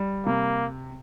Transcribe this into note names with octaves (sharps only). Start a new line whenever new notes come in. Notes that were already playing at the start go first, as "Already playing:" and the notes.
Already playing: G3
C3 A#3